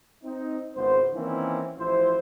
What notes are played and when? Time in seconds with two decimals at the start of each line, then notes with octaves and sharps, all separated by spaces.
0.24 C4 D#4
0.74 G#1 C#2 B3 C5
1.13 D#3 E3 A#3 C4 C#4 E4
1.77 A1 F3 E4 C5